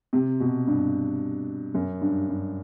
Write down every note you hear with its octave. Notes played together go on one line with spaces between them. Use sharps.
C3
B2
G2
F#2
G2
G2